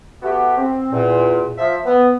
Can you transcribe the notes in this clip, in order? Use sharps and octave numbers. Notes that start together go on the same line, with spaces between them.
A3 B3 F#4 G4
C4
E2 A#2
F3 E5
B3